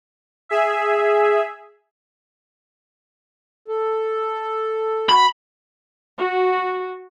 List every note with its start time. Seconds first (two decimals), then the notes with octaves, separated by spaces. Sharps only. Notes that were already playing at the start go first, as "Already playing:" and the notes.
0.49 G#4 E5
3.68 A4
5.09 F#4 B5
6.18 F#4